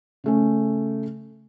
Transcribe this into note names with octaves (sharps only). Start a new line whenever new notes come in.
C#3 A3 C#4